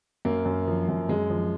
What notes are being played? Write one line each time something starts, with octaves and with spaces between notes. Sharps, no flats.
F#2 A#3
F#2
F3
F#2
F#2 G#3
F3